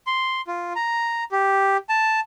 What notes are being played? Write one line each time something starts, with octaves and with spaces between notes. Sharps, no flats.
C6
F4
A#5
G4
A5